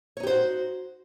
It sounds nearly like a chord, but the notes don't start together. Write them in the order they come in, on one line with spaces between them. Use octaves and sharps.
C#5 D#4 G4 C5 F#4